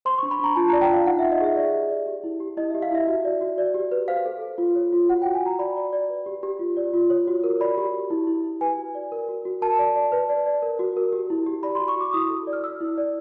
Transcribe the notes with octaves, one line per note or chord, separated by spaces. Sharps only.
C5 C6
C#6
D4
B5
D4 A#5
F4 A5
A#5
D5
G5
F4 F5
D#4 F#5
E5
D#4
D#5
G#4 E5
D5 E5
G4
D5
G4
E4
G4
E4 D#5
E5
G4
F5
E4 E5
F#4
D5
F#4
D5
G4
B4
C5 F5
A4
A4
F4
C#5
F4
F#4 F#5
G5
F#4
G#5
F#4 A#5
D5 B5
D5
D5
B4
G4
G4
F4
D5
F4
C#5
F#4
A#4
D5 B5
G4
G4
E4
E4
E4
B4 G#5
F#4
D5
A#4
F#4
F#4
A#4 A5
D5
D5
B4
D5
D5
A#4
F#4
A#4
G4
E4
G4
D5 B5
C6
F#4
C#6
F#4 D6
E4 D#6
A4
D5
F6
D5 E6
E4
D5